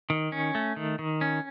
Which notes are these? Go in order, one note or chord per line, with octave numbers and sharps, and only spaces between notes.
D#3
C#4
A3
D#3
D#3
C#4